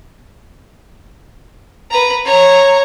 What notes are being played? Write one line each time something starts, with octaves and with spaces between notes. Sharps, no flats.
B4 A#5
C#5 A#5